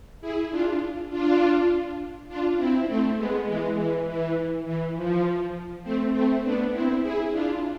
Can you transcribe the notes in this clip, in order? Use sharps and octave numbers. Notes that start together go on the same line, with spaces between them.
E4 G#4
D4 F4
D4 F4
D4 F4
C4 E4
A3 C4
G#3 B3
E3 G#3
E3
E3
E3
F3
A3 C4
A3 C4
B3 D4
C4 E4
E4 G#4
D4 F4